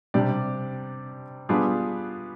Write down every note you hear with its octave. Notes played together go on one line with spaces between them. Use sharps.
C3 G3 D4 G4 D5
G3 B3 D4 F4 G#4